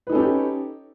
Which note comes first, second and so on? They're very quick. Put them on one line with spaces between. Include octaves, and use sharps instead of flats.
B4 D#4 A4 C#4 G4